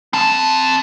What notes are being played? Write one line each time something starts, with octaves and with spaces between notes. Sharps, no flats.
C4 A5